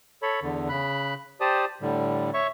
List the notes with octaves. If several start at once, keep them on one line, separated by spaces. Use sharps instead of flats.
A4 C#5 B5
E2 D3
C#3 B5 F#6
G4 C5 D5 A5 D#6
A2 D3 G3
C#5 E5 C#6